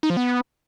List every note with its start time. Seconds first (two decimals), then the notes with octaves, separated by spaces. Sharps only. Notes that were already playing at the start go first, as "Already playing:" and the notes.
0.03 D#4
0.10 F3
0.17 B3